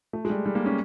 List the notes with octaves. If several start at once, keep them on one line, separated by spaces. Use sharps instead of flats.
A3
G#3
G3
G3
A#3
C#4